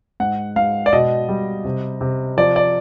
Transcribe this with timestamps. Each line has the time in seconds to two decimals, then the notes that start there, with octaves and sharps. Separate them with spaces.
0.20 G#2 F#5
0.56 G#2 F5
0.86 D5
0.93 B2 D#5
1.29 G3
1.65 C3
2.01 C3
2.37 F3 D5
2.56 D5